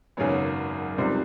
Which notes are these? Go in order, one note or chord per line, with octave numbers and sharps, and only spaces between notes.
G#1 F#2 C#3 F#3 B3
C#2 C3 D#3 G3 C4